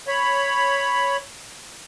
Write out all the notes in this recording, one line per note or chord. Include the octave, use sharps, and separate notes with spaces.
C#5 B5